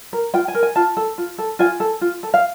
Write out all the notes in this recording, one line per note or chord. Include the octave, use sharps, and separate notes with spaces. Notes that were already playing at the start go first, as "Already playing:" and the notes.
A#4
F4 G5
G#5
A#4
G#5
F4 A5
A4
F4
A4
F4 G#5
A4
F4
A4
F5